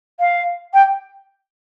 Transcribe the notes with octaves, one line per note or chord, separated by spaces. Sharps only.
F5
G5